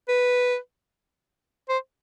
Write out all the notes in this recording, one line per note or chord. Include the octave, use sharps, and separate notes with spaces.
B4
C5